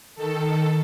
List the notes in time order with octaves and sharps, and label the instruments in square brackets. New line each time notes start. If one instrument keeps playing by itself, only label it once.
[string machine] D#3 A4